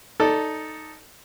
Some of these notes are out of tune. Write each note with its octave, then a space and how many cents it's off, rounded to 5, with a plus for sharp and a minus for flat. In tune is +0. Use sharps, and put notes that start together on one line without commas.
D#4 +0 A4 +0 D5 -15